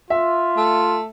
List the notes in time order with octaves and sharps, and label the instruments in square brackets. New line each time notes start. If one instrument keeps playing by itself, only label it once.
[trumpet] F4 [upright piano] E5
[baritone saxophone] A3